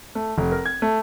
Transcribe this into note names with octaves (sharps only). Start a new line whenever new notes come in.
A3
F1
A#4
G#6
A3